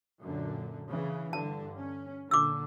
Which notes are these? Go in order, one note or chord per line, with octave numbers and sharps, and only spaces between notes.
F#2 A#2 D3
C#3 E3
G2 D3 A5
C#4
A#2 D3 D6 E6